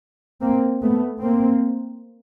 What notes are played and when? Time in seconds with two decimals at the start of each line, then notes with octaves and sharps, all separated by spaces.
0.42 A#3 C4
0.82 A3 B3
1.22 A#3 C4